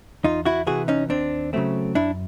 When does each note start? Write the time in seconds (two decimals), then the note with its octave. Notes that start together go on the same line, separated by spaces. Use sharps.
0.24 E2 D#4 F4
0.45 E4 F#4
0.67 C3 E3 F#4 G#4
0.88 C#4 D#4
1.09 D#2 C4 D4
1.53 C#3 F#3 A3 C4
1.95 F#2 D4 E4